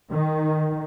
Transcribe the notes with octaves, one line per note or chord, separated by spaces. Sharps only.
D#3